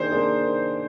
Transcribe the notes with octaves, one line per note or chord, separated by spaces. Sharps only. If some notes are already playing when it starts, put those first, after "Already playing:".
Already playing: D#3 A#3 D4 G#4 C5
A#3 D4 G#4
D#3